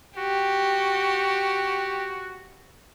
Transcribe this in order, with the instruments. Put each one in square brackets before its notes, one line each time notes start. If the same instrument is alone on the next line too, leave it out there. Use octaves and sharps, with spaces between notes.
[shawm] F#4 [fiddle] G4